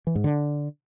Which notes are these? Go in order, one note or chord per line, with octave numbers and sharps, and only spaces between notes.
E3
G#2
D3